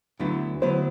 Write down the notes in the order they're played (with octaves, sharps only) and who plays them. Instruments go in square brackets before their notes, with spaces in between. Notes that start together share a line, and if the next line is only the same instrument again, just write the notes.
[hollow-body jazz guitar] D2 D3 F#3 B3 E4
[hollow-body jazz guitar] D2 D3 F#3 B3 E4 [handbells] C5